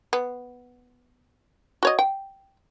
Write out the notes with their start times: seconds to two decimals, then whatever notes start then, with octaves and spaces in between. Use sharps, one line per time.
0.13 B3
1.83 F#4 C#5 D#5
1.99 G5